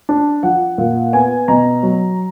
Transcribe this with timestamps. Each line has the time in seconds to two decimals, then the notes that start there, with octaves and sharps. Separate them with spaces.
0.09 D4
0.43 F3 F#5
0.78 A#2
1.13 B3 G#5
1.48 B2 A#5
1.83 F#3